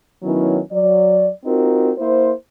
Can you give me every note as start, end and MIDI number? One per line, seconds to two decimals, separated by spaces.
0.23 0.59 51
0.23 0.59 54
0.23 0.59 59
0.23 0.59 61
0.23 0.59 64
0.73 1.29 54
0.73 1.29 74
1.45 1.92 60
1.45 1.92 63
1.45 1.92 65
1.45 1.92 66
1.45 1.92 70
1.99 2.32 58
1.99 2.32 64
1.99 2.32 72